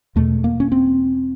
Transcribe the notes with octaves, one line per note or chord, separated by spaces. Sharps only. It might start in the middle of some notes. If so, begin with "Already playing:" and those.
E2 B2 A3
A#3
C#4
C4